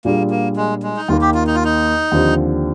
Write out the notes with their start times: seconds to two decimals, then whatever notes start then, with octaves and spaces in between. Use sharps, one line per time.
0.04 A#2 G3 A#3 D4 F4 G#4
0.30 A#3
0.56 G#3
0.83 G#3
0.97 D#4
1.08 D#2 D#3 A#3 F4
1.21 G4
1.34 F4
1.47 D#4
1.55 F4
1.64 D#4
2.12 D#2 D3 F3 C4 G4